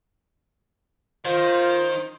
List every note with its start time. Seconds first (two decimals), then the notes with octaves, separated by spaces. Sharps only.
1.25 D#3 F4 C5